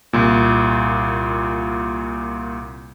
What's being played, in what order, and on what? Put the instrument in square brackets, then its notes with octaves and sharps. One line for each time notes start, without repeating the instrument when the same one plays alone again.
[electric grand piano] C2 A#2